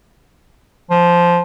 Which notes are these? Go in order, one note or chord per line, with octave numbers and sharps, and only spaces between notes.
F3